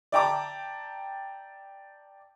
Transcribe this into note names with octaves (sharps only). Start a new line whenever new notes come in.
D5 E5 G5 A5 A#5 D6